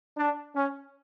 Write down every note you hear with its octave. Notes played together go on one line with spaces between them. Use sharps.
D4
C#4